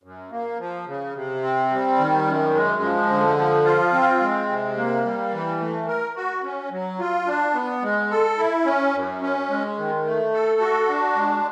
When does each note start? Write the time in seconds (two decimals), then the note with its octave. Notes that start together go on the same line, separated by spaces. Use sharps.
0.04 F#2
0.31 A#3
0.59 F3
0.87 C#3
1.15 C3
1.42 C4
1.70 G3
1.98 D#3
2.26 F#2
2.55 G#3
2.82 F3
3.10 D3
3.37 F3
3.65 F4
3.93 C4
4.21 G#3
4.48 C3
4.77 A#3
5.05 G3
5.33 E3
5.60 A3
5.87 A#4
6.16 F#4
6.44 C#4
6.71 F#3
7.00 F4
7.27 D4
7.54 B3
7.82 G#3
8.11 A4
8.38 E4
8.65 C#4
8.94 F#2
9.22 C#4
9.50 G#3
9.77 D#3
10.05 A3
10.33 A4
10.61 F#4
10.88 D4
11.16 G#3